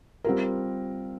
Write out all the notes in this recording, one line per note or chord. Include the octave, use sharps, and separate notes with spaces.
G3 C4 F4 A#4